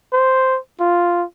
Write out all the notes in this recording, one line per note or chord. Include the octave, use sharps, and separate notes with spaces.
C5
F4